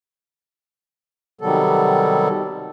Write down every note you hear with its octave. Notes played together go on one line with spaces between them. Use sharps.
C3 D#3 F#3 G3 B3 A4